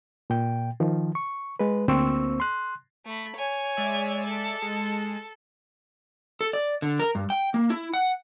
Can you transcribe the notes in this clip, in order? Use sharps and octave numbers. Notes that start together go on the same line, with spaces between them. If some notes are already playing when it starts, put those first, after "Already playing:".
A#2 G5
D#3 F3
C#6
G#3 B4
D2 A#3 C4 C5 C#6 E6
C6 F#6
A3 B5
C#5 G#5
G#3 D5 E5
A4
G#3
A4
D5
D3
A#4
G2
G5
A#3
E4
F#5